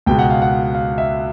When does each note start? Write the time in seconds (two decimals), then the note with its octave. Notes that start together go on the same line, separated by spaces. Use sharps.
0.06 C#2 B2 G#3 G5
0.19 F#5
0.30 F5
0.42 F#5
0.75 F5
0.98 E5